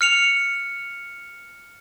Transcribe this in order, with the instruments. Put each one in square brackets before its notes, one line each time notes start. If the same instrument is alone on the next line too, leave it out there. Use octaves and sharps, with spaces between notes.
[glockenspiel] F6 C#7 F7